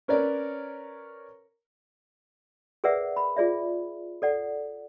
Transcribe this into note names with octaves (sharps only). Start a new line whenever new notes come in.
C#4 A#4 B4 C#5 D5
G#4 A#4 B4 D5 E5 F#5
B5
F4 G#4 D5 E5
A4 D5 F#5